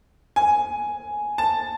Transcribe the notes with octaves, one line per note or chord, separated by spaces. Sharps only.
G#5
A5